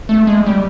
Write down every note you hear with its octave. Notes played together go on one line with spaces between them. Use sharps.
A3
G#3
G3